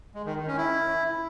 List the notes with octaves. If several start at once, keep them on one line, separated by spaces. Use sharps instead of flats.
G#3
D#3
D#3
C#4
E4